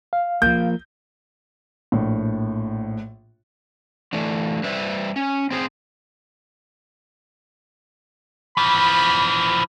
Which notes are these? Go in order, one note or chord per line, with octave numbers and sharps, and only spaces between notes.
F5
F3 A#3 G6
A#1 A2
E3 A3 D4
G3 B4 C5 E5
C#4
C4 G#4 C5
E3 F3 B5